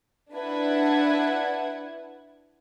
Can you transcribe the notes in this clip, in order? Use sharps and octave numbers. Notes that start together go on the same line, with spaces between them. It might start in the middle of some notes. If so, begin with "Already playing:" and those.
D4 E4 B4 F#5 G#6